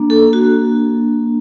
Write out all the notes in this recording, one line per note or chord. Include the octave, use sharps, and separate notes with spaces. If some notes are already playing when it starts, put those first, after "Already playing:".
Already playing: A#3 D4
A4
F#4